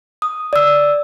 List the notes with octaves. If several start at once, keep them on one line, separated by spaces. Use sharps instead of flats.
D#6
D5 E6